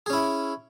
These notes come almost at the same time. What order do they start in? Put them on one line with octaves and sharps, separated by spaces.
G#4 C#4 E4